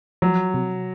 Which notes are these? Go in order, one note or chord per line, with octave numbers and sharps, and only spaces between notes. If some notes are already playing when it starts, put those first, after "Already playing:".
F3 F#3
C3